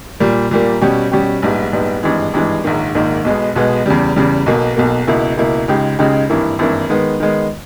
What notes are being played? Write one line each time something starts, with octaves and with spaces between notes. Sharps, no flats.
A#2 G3 A#3
A#2 G3 A#3
B2 G3 C#4 G4
B2 G3 C#4 G4
A#1 G#2 G3 B3
A#1 G#2 G3 B3
G#1 G2 E3 G#3
G#1 G2 E3 G#3
A#1 G#2 D#3 A#3
A#1 G#2 D#3 A#3
B1 B2 G#3 B3
B1 B2 G#3 B3
E2 C#3 G3
E2 C#3 G3
B1 B2 A#3
B1 B2 A#3
C#2 B2 A#3 E4
C#2 B2 A#3 E4
C#2 C#3 G#3 D#4 G4
C#2 C#3 G#3 D#4 G4
G#1 G2 E3 A#3 E4
G#1 G2 E3 A#3 E4
D#3 G#3 B3
D#3 G#3 B3